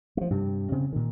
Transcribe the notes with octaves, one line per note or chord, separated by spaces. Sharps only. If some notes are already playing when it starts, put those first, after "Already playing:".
F3 A3
G2 C3
C#3 C4
A#2 D#3